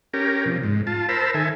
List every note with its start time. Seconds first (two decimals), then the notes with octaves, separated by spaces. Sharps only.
0.14 C#4 G4 A#4
0.46 C3 F3
0.63 G#2
0.87 F4 A5
1.09 A#4 C5 A5 B5 E6
1.34 D#3 A4 E5 G#5